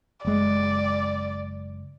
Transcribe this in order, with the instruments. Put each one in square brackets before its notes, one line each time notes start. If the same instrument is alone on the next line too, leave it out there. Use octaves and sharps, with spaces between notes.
[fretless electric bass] F#1 G#3 [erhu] D5